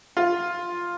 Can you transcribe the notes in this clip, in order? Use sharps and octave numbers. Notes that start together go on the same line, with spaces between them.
F4